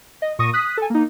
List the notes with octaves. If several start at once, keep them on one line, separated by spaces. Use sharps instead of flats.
D#5
A#2 C#6 D#6 A#6 D#7
D#6 F#6 B6
A4 G#5
A#3 D#4